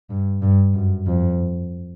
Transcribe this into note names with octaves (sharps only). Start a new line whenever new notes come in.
G2
G2
F#2
F2